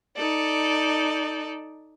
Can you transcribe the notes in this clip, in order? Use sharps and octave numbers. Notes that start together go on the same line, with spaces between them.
D#4 A4 D5